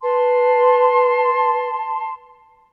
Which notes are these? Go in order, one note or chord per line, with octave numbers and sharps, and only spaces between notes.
B4 A5 C6